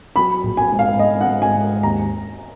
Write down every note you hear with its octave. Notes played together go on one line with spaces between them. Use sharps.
F#3 B5
A#1
G#5
G#2
F5
G#2 D#5
F#5
G#2
G#5
G#2
D#2 A#5